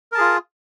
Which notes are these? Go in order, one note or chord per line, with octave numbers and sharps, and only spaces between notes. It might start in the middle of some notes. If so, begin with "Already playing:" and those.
F4 G#4 A#4 A5